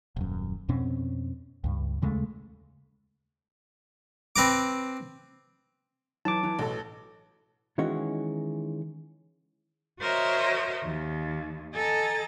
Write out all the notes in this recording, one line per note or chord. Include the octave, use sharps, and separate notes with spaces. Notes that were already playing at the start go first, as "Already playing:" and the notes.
D#1 F#2
F2 B2 C4 C#4
C#2 G2
D#2 C#3 G#3 A3
C4 B4 A#5 D6
E3 F#3 A5 D6
E3
A1 B2 A4
D#3 E3 G#3 C#4 F#4
F#4 A#4 C5 C#5 D#5 E5
D#2
A4 D#5 G#5 A#5 A6